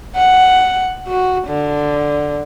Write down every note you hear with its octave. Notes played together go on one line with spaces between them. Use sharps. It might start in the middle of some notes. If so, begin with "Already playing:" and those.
F#5
F#4
D3